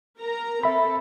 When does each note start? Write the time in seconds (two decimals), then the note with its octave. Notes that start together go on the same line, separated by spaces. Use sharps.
0.19 A#4 A#5
0.63 C4 A4 E5 B5